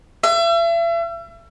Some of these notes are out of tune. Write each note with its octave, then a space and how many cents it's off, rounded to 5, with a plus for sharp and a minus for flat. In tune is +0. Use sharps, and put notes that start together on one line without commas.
E5 +40